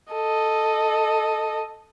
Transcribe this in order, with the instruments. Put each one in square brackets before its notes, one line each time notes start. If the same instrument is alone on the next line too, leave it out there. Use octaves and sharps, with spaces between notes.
[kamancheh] A4 D#5